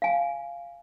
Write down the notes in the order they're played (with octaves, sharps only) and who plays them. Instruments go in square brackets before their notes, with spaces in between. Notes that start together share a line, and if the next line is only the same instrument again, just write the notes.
[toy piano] F5 G#5